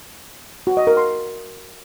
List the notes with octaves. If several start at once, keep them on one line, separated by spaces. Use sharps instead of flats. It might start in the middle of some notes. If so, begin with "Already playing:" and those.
F#4
D#5
A#4
C6